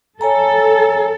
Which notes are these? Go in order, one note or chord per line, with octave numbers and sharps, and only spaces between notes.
A4 C#5 G#5 A#5